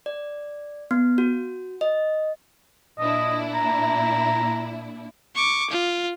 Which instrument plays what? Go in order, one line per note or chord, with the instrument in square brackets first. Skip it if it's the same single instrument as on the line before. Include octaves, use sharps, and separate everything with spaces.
[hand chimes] D5
B3
F#4
D#5
[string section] A#2 D4 E4 [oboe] D#5
[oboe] A#5
[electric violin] C#6 D6
F4